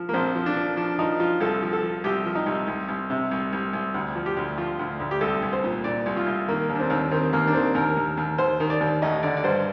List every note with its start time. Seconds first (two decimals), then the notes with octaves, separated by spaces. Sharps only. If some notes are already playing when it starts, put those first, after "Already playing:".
Already playing: F3
0.09 A#3
0.14 A#1 C4
0.35 F3
0.46 D4
0.56 F3
0.77 F3 D4
0.99 F3 D#4
1.20 F3 F4
1.40 C2 A4
1.62 F3
1.73 A4
1.83 F3
2.04 C2 G4
2.25 F3
2.35 D#4
2.46 C2
2.67 C2
2.88 C2
3.10 C3
3.31 C2
3.53 C2
3.73 C2
3.94 D2
4.15 F3
4.26 G4
4.37 D2
4.58 F3 F4
4.79 D2
5.00 D2
5.11 G4
5.21 C2 A4
5.42 C2
5.53 C5
5.64 A#2
5.84 A#2 D5
6.06 C2
6.17 F4
6.27 C2
6.48 D#3 A#3
6.69 D#2
6.75 D4
6.80 C4
6.90 D#2
7.11 D#3 C4
7.33 D#2 A#3
7.47 D4
7.54 D#3 C4
7.75 D#2 A#4
7.97 D#2
8.17 D#2
8.38 D#2 C5
8.60 D#3
8.70 D5
8.81 D#2
9.02 A1 D#5
9.23 D3 D5
9.37 D5
9.44 G2 C5